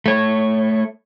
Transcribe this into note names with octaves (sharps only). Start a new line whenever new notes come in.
A3 C#5